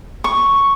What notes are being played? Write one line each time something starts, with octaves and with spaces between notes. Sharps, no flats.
C#6